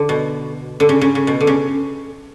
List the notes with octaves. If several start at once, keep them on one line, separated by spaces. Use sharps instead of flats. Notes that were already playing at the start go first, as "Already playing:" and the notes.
Already playing: D3
B2
D3
C#3
C#3
C#3
B2
D3
C#3